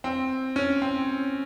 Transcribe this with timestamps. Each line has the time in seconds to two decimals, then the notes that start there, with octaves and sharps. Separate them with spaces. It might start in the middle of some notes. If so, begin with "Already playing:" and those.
0.04 C4
0.56 C#4
0.82 C4